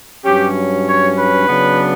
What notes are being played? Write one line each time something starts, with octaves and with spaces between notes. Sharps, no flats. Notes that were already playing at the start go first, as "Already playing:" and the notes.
G2 F#3 C#4 G4
C#5
B4
C#3 F#3 B3 D4